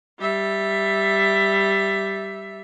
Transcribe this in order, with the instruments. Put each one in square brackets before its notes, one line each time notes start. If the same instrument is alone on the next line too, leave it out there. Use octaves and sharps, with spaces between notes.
[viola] G3 E5